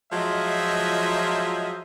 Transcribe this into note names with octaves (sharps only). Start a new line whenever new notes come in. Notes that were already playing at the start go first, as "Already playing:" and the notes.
F3 F#3 G#3 F4 D#5 E5